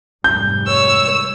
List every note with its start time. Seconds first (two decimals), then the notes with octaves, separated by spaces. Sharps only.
0.24 F1 G#2 G3 G6
0.67 C#5 E6